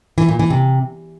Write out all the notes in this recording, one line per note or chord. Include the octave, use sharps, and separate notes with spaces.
E3
A#2
E3
C3